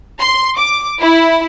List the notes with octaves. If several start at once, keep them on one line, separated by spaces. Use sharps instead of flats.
C6
D6
E4